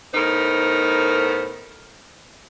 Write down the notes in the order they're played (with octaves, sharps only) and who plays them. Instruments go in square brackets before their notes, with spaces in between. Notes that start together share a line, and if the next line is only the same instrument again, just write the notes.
[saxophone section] A2 B3 D#4 A#4 C5